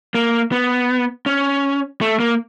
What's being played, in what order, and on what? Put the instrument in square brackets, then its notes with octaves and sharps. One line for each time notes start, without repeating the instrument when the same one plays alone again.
[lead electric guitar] A#3
B3
C#4
A3
A#3